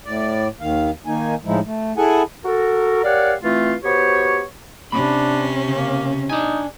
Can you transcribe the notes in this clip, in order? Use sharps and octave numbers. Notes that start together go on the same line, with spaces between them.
A2 D5
D#2 D#3 F5
D#3 A#3 D#4 G#5
A2 F3 G#3 D#4 E4
A3
E4 G#4 A4 F#5 G#5
F#4 A4 A#4
G4 A#4 C#5 D5 F5 F#5
E3 A3 C4 F4
B3 F#4 G4 C5 C#5
C3 C#4 D4 B5
C#3 A#3
D4 D#4 G#5